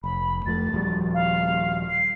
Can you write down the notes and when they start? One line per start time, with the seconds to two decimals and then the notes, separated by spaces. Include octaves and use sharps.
0.04 F1 B5
0.46 F2 F3 A3 A6
0.72 D#1 F3 G3
1.14 F5
1.89 C7